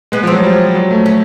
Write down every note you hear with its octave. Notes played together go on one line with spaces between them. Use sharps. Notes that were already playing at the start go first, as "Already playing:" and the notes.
G#3 B3
F3
C4
F#3
G3
F#3
A3
C#4